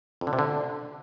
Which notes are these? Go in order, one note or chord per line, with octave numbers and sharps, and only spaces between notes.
F2
D3
C3
D3